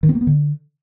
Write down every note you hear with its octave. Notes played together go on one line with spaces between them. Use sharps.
D#3
C4
A#3
B3
D3